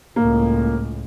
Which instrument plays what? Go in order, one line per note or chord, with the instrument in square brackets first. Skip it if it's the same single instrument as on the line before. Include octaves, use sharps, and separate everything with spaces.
[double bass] C#2 A2 [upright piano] A#3